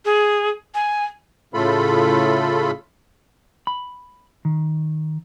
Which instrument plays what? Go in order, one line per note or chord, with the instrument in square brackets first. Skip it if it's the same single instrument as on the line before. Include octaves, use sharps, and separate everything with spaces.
[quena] G#4
G#5
[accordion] A2 C#3 A3 F4 A4 B5
[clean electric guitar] B5
D#3